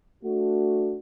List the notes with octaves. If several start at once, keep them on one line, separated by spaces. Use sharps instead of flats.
A3 D4 F#4